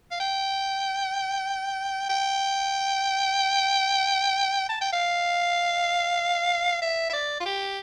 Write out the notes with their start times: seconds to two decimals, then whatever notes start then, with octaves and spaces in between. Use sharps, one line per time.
0.11 F5
0.20 G5
2.09 G5
4.69 A5
4.81 G5
4.92 F5
6.82 E5
7.09 E5
7.13 D5
7.40 F4
7.45 G4